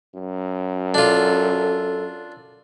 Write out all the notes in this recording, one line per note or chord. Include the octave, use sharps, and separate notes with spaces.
F#2
D4 F4 A4